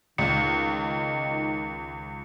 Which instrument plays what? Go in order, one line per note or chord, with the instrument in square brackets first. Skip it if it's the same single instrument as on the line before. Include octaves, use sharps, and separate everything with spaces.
[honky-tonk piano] C#2 [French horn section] D#3 [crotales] C#7